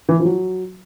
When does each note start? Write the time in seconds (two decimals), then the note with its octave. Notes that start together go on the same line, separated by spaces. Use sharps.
0.09 E3
0.20 F3
0.25 F#3